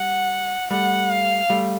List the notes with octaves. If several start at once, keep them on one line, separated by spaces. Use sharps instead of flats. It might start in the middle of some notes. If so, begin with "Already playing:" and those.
Already playing: G3 F#5
G3 A3 F#5
F5
G3 A3